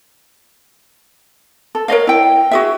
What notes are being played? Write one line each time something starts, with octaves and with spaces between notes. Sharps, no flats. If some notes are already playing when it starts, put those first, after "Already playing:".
A4
A#4 C#5 D#5 F5
E4 G5
F#4 G#4 E5